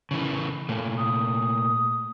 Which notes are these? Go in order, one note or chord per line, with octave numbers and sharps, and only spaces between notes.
C#3 E3
A#2 A3
D#6